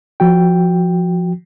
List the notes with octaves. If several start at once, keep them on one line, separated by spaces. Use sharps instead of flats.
F3 F#4 G5